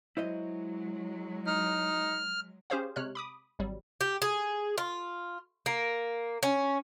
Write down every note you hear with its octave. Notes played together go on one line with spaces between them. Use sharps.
F#3 G#3 E4 C5 D#5
D#4 F6
C#4 G4 G#4 C5 C#5 F5
C3 G#3 C#5 F6 F#6
B5 D6 D#6
G#1 F#3 G3
G4
G#4
F4
A#3
C#4